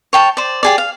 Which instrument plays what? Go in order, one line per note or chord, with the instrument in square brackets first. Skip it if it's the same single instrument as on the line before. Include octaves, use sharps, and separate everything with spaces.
[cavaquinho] C#5 G5 A5
C5 D5
G4 G#4 D5
F5